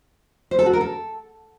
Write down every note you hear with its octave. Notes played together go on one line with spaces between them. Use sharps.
C5
A4
F#4
A#4
A4